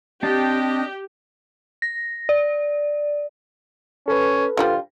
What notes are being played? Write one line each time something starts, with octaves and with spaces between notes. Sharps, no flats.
C4 D4 G4 D#5 A5
A#6
D5
C#4 A4 B4
D3 F3 G3 F4